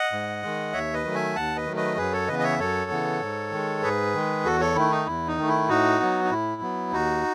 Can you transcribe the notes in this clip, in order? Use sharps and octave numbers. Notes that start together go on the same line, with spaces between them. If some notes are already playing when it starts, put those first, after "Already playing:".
Already playing: D#5 F#5
G#2
D#3 G#3
D#2 C#5 E5
B4 D#5
D#3 F#3 A3
E5 G#5
D#2 F#5 A5
B4 D#5
D#3 F#3 A3
B4 D#5
F#2 G#4 B4
A4 C#5
C#3 E3 B3 B4 D#5
D#5
C#5 E5
F#2 A4 C#5
C#3 E3 B3
G#2
D#3 G#3
G#2 G#4 B4
D#3 G#3
E2 F#4 A4
A4 C#5
D#3 A3 E4
D#4
E2 E4
D#4
D#3 A3
E4
A2 D#4 F#4
F#3 B3
D#4
A2 E4
F#3 B3
D#2 D#4 F#4